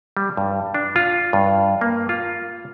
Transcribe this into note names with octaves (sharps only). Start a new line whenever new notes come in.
G3
G2
D4
F4
G2
A#3
F4